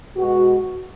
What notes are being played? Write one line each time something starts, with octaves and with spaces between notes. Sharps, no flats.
B2 G#3 F#4